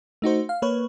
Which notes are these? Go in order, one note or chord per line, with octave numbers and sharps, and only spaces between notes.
A3 D#4 F#4 C5
F5
A#3 B4 C#5